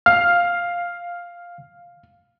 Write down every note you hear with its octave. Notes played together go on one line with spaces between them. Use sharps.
F5 F6